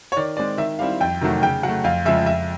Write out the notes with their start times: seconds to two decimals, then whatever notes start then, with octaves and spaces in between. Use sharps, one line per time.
0.12 C#5
0.17 D#3 D5
0.37 G#3 C4 D5
0.58 D#3 E5
0.79 G3 C4 E4 F5
1.01 F2 G5
1.21 C3 D#3 F#3 A3
1.42 C#3 G5
1.63 F#3 F#5
1.68 A3
1.84 F2 F5
2.05 C#3 F3 G#3 E5
2.26 F2 E5